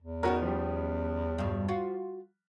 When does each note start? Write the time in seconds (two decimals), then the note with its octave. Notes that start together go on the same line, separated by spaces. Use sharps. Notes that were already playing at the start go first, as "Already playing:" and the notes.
0.02 E2
0.23 D#3 B3 C#4 F#4 A#4
0.42 F3 G3
1.38 G2 B2
1.68 F4 F#4